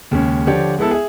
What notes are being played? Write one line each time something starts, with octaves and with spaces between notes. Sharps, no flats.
D#2 C#3 G#3 C#4
D3 F3 G4 C#5 D5
G#3 B3 E4 A4 E6
G#4 E5